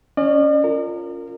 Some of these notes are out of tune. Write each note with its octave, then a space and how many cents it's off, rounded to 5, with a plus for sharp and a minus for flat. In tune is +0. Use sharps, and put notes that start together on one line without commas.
C#4 +10 D5 +45
F4 +0 A#4 -30